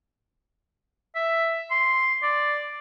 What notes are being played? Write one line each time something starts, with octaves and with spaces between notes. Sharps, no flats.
E5
C6
D5